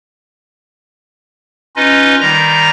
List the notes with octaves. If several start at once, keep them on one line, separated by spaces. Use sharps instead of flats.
C#4 D#4 F4 B4 D#5
D#3 G3 A#5 A#6